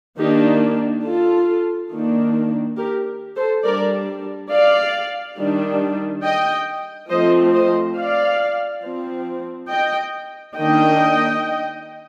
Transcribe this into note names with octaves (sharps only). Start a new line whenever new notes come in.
D#3 A#3 D4 D#4 G4
F4 A4
D#3 A#3 D4
G4 A#4
A4 C5
G3 D4 A#4 D5
D5 F5
D#3 G3 D4
D#5 G5
F3 A3 C4 C5 D#5
C5 D#5
D5 F5
F3 C4
D#5 G5
D#3 A#3 D4 D#5 G5